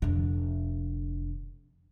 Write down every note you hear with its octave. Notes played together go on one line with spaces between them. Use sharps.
F1 D3